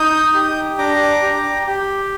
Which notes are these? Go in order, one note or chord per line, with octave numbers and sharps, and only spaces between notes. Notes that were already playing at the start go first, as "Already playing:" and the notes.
Already playing: D#4 D#6 G6
G4
D4 A#5 D6
G4
G4